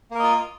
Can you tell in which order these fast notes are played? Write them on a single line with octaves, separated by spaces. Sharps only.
A#3 A#4 D#5 F4